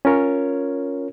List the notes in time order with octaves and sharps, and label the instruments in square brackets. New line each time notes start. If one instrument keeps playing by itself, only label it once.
[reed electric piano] C#4 F4 A#4 C#5